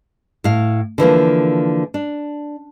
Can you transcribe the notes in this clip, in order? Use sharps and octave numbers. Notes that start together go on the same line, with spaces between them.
A2 F5
D3 E3 F3 A#3
D4